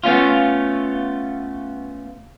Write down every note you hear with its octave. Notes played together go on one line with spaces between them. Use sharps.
A3 B3 C#4 F4